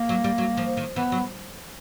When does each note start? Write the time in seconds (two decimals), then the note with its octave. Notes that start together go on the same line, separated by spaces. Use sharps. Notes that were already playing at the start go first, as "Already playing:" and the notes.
Already playing: A#3
0.09 F#3
0.24 G3
0.38 F#3
0.57 F3
0.77 D#3
0.96 E3 B3
1.12 F#3